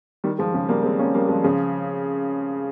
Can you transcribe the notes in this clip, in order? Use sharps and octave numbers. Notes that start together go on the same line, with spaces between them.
D#3 G3
F3 G#3
C#3
G3 A#3
G#3 C4
A#3 C#4
G3 A#3
F3 G#3
C#3 F3